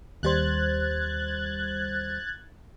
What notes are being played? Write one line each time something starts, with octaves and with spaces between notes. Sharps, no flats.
D#2 G3 C5 F#6 G#6 A6